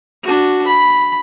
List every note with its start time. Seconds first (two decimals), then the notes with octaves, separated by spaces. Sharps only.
0.23 D4 F#4
0.67 B5